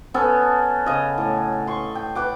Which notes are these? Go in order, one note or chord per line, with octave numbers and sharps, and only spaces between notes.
B3 C#4 A4
C#3 D#5
A2
C6 C#6
G5
B4 F#5 D6